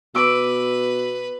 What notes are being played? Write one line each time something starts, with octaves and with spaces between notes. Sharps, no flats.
B2 B4 D6 E6